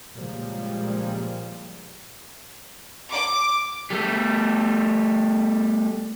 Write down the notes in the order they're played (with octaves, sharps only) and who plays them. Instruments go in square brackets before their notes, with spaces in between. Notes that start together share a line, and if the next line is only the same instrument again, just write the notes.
[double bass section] A#2 C#3 F3 G3 G#3 A#3
[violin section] D6
[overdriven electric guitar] G3 A3